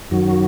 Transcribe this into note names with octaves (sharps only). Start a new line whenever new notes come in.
F#2 D#3 F#3 F#4